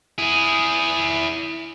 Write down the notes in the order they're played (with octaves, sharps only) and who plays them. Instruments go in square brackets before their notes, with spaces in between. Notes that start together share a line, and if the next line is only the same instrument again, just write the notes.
[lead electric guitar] E4 G#4